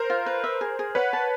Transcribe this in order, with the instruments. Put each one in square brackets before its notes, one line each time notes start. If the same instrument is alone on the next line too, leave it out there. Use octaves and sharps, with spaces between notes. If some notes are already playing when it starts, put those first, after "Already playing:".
Already playing: [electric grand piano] A#4 C5
[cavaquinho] F4
B4
E5
G#4
G#4
[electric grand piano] B4 C#5 [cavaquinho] F#5
[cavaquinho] A5